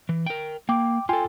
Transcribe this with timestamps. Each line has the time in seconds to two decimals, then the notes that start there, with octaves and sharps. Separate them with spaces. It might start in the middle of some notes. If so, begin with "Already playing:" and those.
0.09 E3
0.26 A#4 G5
0.69 A#3 G5 D6
1.09 F4 A4 G5 G#5 C6